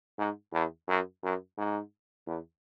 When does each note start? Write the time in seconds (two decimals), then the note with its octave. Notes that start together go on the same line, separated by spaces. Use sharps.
0.18 G#2
0.53 E2
0.88 F#2
1.23 F#2
1.57 G#2
2.27 E2